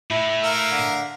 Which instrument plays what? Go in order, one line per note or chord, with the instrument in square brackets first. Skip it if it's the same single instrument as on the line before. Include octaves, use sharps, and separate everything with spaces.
[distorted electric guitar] A2 [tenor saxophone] E4
[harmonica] A#4 E5 F5
[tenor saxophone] D3